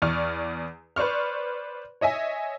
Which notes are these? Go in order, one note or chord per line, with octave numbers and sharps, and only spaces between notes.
E2 D5 C#6 F6
B4 C5 D5 C#6 F6
C#5 D#5 E5 G#5